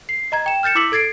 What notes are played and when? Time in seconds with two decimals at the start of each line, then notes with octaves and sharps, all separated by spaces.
0.09 C7
0.32 D#5 A#5 G#6
0.46 G5 E7
0.63 F6 G6 A6 C#7 E7
0.75 E4 D6 E6 B6 F#7
0.92 A4 G#6 A6 C7 D7